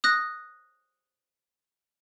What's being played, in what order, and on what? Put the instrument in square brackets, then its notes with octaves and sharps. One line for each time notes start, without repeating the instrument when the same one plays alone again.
[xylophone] D#6 F#6 A#6